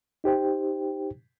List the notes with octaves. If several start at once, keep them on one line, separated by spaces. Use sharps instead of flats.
D#4 G4 C5 G5